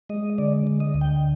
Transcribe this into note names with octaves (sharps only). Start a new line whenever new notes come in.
G#3 D#5
D3 D5
D3
D#5
D2
G5